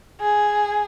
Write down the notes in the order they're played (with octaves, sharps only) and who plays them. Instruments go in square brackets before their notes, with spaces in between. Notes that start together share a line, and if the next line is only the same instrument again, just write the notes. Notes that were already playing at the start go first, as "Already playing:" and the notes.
[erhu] G#4